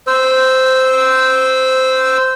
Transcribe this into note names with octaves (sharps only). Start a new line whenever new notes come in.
C5 E6